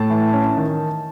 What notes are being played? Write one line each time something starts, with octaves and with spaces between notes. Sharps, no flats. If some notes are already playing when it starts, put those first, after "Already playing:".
Already playing: A2 A5
E3
C#4
D#3